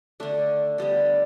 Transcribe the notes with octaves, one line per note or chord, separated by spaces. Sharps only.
D3 A3 D4
D3 G3 B3